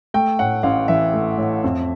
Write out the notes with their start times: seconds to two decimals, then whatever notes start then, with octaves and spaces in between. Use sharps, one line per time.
0.14 A3 G5
0.39 A2 F#5
0.63 A1 F5
0.88 E3 E5
1.14 A3
1.38 A2
1.64 F2